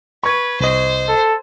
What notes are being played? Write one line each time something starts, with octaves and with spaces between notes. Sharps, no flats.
B4 C#6 G#6
C2 C5 D#5
A4